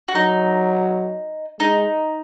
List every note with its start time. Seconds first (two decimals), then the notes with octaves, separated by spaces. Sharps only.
0.08 F#4
0.15 F#3 D#4
1.60 G#3 D#4